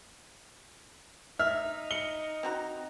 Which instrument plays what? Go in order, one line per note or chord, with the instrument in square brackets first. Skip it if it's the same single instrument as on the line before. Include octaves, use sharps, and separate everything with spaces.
[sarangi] D#4 [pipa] E5 [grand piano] F6
[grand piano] C#7 G7
[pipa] C4 F#4 A#5